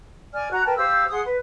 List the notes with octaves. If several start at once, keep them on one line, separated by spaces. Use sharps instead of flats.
D5 G#5 F6
F#4 A#5
A#4 B4 G5 A5
G4 C5 F5 E6
G#4 F#5 C6 D#6
B4